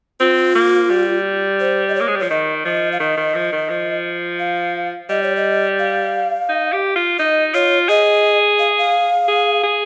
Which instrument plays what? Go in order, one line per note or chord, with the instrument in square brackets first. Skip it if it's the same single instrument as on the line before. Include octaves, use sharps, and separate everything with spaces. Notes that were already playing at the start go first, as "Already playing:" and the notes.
[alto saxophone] C4 [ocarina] F4
[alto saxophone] A#3
G3
[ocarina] C5
D#5
C#5
[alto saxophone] A#3
G#3
G3
[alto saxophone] F3 [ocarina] C#5
[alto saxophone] D#3 [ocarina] D#5
[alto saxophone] F3 [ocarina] D#5
[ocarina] F5
[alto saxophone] D#3 [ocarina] D#5
[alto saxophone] D#3
F3
D#3
F3
[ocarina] F5
[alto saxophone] G3 [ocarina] D#5
[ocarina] C#5
D#5
F5
[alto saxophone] D#4
G4
F4
[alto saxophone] D#4 [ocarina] D#5
[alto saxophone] F4 [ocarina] C#5
[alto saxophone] G#4 [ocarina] D#5
[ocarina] F5
F5
[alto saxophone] G#4
G#4